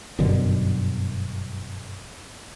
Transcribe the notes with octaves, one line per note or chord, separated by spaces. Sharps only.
G1 F#2 B2 D3